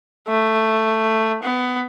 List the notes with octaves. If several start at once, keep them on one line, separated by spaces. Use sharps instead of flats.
A3
B3